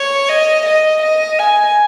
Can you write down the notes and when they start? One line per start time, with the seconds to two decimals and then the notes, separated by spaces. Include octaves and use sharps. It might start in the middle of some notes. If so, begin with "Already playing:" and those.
Already playing: C#5
0.29 D#5
0.66 D#5
1.02 D#5
1.39 G#5